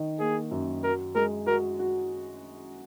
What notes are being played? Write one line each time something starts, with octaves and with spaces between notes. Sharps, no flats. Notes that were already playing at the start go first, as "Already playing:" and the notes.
Already playing: D#3 D#4
A#3 G#4
F#2
F#4 A#4
G#3 A#4
F#4 A#4
F#4